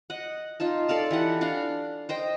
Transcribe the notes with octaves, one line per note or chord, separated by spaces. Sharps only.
D#5 F#5
D#4 F4 A5
A4 D5 F5 A5
E3 G4 F#5
D4 F5 F#5
C5 D#5 G5